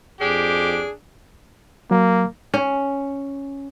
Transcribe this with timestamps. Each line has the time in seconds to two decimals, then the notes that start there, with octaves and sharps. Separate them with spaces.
0.21 F2 D4 G4 G#4
1.91 F#3 A#3
2.54 C#4